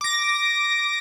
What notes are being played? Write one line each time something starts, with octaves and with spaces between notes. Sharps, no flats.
D6 A#6